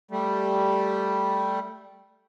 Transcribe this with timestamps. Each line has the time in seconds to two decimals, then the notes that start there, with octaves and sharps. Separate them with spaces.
0.11 G3 A3